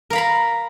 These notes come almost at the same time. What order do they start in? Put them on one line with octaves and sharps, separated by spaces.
A#4 F5 B5 A#5